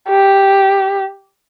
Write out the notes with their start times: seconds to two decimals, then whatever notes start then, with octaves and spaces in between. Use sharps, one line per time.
0.08 G4